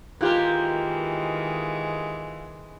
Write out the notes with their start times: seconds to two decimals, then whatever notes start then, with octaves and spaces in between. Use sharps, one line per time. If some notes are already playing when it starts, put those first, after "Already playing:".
0.21 D#3 E3 G#3 A#3 F4 G4 A#4 F#6